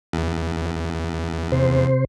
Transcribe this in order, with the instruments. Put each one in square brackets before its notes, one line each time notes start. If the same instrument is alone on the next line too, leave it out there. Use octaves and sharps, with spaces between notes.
[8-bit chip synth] E2
[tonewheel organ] C3 C5